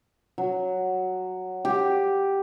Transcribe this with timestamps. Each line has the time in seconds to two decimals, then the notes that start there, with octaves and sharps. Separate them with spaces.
0.38 F#3
1.65 G4